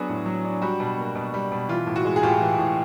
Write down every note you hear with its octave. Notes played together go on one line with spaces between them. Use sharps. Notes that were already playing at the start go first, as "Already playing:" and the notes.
Already playing: F#3 B3 D4 F#4 G#4
A2
F#3
D4
G3 F#4
B2
A#3
B2
G3
B2
E3 F4
A2
F#4
G#3
G#4
A2 F4 G4
E3
A2